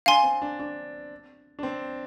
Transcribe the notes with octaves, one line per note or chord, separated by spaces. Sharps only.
D4 F5 G#5 C6
C4
D4
D4
D4
C4